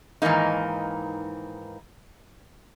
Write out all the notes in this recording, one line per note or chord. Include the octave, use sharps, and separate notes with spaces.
G#2 D#3 E3 A#3 D#4